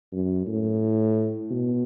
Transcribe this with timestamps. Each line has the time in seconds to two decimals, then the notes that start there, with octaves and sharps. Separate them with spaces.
0.12 F#2
0.47 A2
1.51 B2